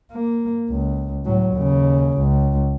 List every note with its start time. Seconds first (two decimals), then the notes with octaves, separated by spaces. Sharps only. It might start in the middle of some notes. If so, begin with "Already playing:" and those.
0.12 A#3
0.70 C#2
1.25 A2 F#3
1.54 D#2 C#3
2.18 C#2